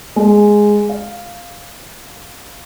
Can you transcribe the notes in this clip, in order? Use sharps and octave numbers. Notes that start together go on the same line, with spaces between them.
G#3
F5